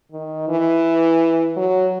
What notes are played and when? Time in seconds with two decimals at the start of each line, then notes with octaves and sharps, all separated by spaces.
0.12 D#3
0.49 E3
1.57 F#3